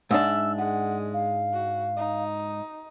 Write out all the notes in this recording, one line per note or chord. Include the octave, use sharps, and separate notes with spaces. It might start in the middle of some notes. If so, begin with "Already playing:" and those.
G#2 D4 E5 E6
G#3 F#5
F5
F#4
D#4